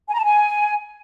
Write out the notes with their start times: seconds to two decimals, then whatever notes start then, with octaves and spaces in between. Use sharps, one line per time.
0.08 G#5
0.13 A#5
0.18 A5
0.24 G#5